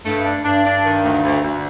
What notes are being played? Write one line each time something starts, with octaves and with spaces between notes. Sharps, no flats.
G2 A3
D4
G2 D4
D4
D#3
D2
D2
D2